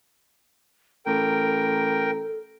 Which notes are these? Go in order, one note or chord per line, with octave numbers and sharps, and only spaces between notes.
A1 A4 A#4 G5